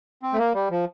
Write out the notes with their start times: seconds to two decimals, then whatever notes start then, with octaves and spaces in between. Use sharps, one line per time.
0.23 C4
0.33 A3
0.39 A#3
0.54 G3
0.71 F3